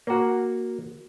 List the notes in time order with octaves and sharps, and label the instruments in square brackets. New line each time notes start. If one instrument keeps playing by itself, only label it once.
[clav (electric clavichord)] A#3 F#4